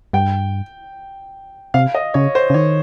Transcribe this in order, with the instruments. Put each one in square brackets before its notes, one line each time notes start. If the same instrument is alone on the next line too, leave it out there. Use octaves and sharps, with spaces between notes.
[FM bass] G2 [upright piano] G5
[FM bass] C3 [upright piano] F5
[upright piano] D#5
[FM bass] C#3 [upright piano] C#5
[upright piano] C5
[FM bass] C#3
[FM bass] D#3 [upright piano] C#5